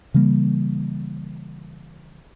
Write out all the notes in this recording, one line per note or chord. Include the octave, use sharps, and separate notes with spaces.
C#3 E3 G3 A#3